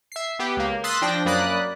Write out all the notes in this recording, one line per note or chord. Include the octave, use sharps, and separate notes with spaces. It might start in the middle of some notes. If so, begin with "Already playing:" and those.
E5 C7
B3 G4 G5
C#2 A#3
C6 D#6 E6 F#6 A6 B6
F3 D4 G5 A#6
F#2 A#3 D5 B5 D#6 F#6